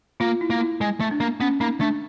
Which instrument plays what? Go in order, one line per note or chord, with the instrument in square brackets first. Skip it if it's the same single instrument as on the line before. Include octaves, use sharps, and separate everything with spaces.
[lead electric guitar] A#3 [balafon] F4
[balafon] E4
[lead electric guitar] A#3
[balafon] E4
[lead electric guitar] G#3
A3
[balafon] D4
[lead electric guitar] A#3
[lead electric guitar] B3 [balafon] C#4
[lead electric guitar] A#3 [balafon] D#4
[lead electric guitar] A3 [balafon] D4